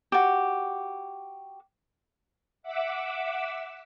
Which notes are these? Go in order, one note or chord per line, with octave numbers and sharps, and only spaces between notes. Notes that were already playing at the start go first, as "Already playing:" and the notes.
F#4 G4
E5 F#5 D6 E6